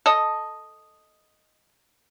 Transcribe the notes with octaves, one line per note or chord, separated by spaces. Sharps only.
A4 D#5